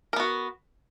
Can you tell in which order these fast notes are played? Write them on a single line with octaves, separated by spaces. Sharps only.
A#4 B3 F#4